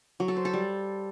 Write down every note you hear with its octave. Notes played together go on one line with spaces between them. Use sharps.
F#3
A4
C5
A4
G3